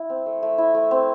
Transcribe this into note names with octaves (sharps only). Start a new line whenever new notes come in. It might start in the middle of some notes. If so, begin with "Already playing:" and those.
Already playing: E4
C4
A3
A3
E4
A3
C4